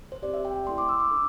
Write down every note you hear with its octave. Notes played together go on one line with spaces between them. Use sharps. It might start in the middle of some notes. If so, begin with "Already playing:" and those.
C5
C4 G4 D5
E5
G5
A3 E4 A4 C6
D6
E6
D6
D4 A4